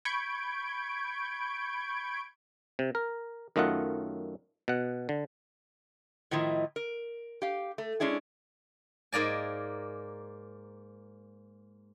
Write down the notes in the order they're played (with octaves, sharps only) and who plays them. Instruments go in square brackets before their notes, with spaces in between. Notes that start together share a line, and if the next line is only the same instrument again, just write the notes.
[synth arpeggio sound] B5 C#6 G6 G#6 D7
[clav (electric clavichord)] C3
A#4
F#2 D#3 A3 F4 D#5 F#5
B2 F#5
D3
[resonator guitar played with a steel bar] A2 D#3 F3 E4 D#5
A#4
G4 F5
A3
G#3 C#4 D4 E4 G#4
[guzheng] G#2 A#3 D5 G#5